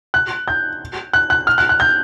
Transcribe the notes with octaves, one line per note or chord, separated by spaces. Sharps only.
F#6
G6
F#6
F#6
F6
F#6
F#6
G6